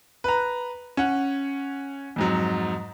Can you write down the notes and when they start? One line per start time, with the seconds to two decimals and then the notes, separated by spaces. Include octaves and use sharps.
0.24 B4 A#5
0.97 C#4 F#5
2.16 F2 G#2 F#3